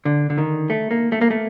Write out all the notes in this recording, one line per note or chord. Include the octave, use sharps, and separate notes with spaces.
D3
D3
D#3
A3
A#3
A3
A#3
A3